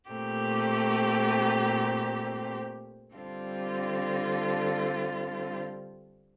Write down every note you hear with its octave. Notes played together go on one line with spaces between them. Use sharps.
A#2 A3 C4 G4
D3 G3 C4 F4